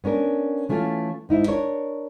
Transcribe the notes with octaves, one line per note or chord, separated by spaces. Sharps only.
B3 C#4 D4 A#4
E3 A3 C#4 F4
G#2 D#4 E4
D4 A#4 C#5